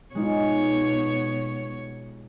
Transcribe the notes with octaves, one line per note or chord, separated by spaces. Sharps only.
B2 G#3 D#4 F4 C#5